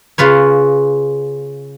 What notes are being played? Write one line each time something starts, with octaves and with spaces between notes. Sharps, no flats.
C#3 F4 B4 C#5